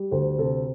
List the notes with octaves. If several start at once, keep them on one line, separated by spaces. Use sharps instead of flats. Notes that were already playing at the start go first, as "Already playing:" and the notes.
Already playing: G3
D2 A4 C5
C3 A4 C5